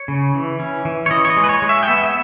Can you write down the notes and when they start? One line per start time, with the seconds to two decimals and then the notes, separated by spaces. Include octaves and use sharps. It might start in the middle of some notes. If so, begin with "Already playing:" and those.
Already playing: C#5
0.08 C#3
0.34 E3
0.60 C#4
0.85 E3
1.06 C#5
1.11 E3 D#5
1.25 C#5
1.30 D#5
1.37 G#3
1.44 B4
1.49 C#5
1.62 G#3
1.69 E5
1.83 G5
1.88 B3 E5
2.03 E5